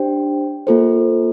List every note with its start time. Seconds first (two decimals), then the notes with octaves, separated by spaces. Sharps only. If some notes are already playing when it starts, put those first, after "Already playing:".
Already playing: D4 G4 C5 G5
0.67 A#3 F4 A4 C5